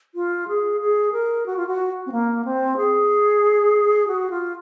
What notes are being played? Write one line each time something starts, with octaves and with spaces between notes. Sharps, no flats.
F4
G#4
G#4
A#4
F#4
F4
F#4
C4
A#3
C4
G#4
F#4
F4